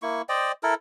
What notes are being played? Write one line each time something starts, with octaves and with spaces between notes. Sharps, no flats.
A#3 E4 C#6
C5 D5 D#5 G5
E4 A4 A#4